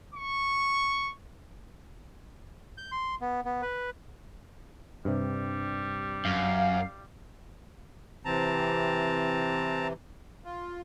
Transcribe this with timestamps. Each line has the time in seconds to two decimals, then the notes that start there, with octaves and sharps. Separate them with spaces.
0.14 C#6
2.78 G6
2.92 C6
3.21 B3
3.45 B3
3.62 B4
5.05 G2 C3 G3
6.25 F#2 F5
8.25 C3 E3 C4 A5 A#5
10.45 F4